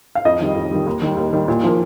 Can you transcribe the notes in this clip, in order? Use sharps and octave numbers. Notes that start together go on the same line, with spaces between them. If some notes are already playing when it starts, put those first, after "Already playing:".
F5
F2 D#5
D#3 G3
F2
D#3 G3
D#2
D#3 G3
D#2
D#3 G3
A#2
F3 A#3